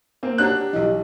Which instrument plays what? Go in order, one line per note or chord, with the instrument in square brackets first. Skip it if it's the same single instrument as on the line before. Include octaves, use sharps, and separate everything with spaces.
[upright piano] A#3 C4
[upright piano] D4 F#4 [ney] G4 [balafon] C#5 D5 A#5 [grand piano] F#6
[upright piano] B1 E3 [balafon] D#5